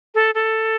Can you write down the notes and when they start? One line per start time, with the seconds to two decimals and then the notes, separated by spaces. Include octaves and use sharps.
0.15 A4
0.35 A4